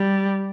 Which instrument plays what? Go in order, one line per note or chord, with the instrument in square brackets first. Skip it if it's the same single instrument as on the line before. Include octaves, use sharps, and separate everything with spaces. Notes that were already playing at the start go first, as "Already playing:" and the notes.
Already playing: [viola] G3